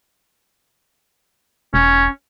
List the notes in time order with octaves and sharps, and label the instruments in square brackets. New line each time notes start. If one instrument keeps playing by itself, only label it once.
[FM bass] E1 [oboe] C#4